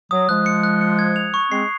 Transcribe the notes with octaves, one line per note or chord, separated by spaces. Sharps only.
F#3 D#6
F3 G#3 F#6
C#7
F#6
C#7
G#6
F7
C#6
G#3 C4 C7